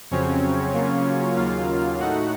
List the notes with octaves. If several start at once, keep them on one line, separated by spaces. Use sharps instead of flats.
F2 C#3 F#3 C4 C#4 C#5
C#3 F#3 A#3 F4
D#2 C#3 F#3 A#3 F4 F5
A2 A3 D#4 F#4 F#5